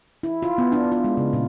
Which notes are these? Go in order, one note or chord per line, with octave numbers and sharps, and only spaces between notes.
E4
F4
B3
D4
F4
G#3
C#3
A#2